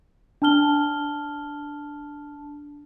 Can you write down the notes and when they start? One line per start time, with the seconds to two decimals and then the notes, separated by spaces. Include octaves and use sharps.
0.42 D4 A5 F6 G7